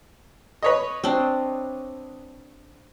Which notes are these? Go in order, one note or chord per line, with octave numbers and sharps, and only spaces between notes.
B4 C#5 D#5
C4 D4